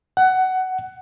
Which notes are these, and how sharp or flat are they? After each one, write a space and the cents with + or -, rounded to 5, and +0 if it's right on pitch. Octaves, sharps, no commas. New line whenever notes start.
F#5 +15